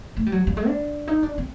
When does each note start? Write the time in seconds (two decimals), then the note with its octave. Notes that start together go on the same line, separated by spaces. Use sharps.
0.17 A3
0.26 G3
0.32 F#3
0.47 G3
0.57 G#3
0.67 D4
1.08 D#4
1.23 D4
1.38 C4